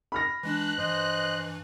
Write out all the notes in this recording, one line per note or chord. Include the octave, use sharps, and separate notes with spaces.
B5 F6 A#6
E3 G#3 D4 F#6
G2 E3 C5 D#5